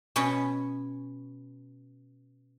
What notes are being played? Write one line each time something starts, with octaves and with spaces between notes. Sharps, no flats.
B2 C#4 C#5 B5